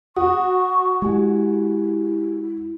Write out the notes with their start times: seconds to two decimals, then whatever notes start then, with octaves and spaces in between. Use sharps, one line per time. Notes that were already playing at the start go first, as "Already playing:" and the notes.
0.16 F#4 C#6 D#6
1.02 G#3 E4 G4 G#5